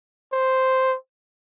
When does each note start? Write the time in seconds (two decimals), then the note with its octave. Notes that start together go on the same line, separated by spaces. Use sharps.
0.33 C5